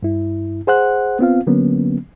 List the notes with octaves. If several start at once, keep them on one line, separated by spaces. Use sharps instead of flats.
G2 E4
G#4 C5 F#5 F#6
B3 C4 F4 F5
D3 F#3 A#3 B3 C#4